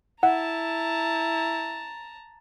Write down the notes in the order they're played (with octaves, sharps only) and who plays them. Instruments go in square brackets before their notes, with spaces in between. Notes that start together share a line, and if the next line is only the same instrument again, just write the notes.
[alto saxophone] E4 [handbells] F#5 [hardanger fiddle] A5 A#5